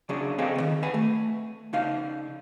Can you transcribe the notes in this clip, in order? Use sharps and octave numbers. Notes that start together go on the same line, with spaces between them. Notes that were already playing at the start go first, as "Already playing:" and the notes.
C#3 F#3 C#4 D4 G#4
C4 G#4 A4 D#5 F5 G#5
D2 D#3
B4 F#5 G#5
A3
C#3 D#4 F5